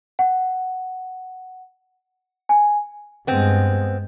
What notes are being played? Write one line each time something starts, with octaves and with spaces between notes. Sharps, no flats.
F#5
G#5
G2 G#3 B3 C4